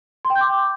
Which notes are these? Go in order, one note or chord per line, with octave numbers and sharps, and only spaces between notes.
C6
G5
G6
D6